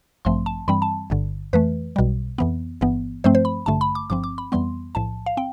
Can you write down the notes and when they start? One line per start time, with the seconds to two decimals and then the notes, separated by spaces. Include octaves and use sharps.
0.25 A1 G2 F3 A3 C4 C6
0.46 A5
0.68 G2 E3 G3 C4 B5
0.82 A5
1.10 G1 G2 D3
1.53 F2 E3 A3 B4
1.96 B1 B2 G3
2.38 F2 E3 B3
2.81 G1 G2 E3 B3
3.24 G2 F3 A3 C4 C5
3.35 C5
3.45 B5
3.66 A1 G2 D3 A3 A5
3.81 B5
3.95 D6
4.10 G1 G2 F3 C4 D6
4.24 D6
4.38 B5
4.52 F2 E3 G3 B3 C6
4.95 B1 A2 F3 A5
5.26 F5
5.37 C4 G5